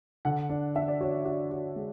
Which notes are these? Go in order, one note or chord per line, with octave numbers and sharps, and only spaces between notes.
D3 F#5
D4
D4 E5
D5
F#4 C#5
F#4
F#4
G#3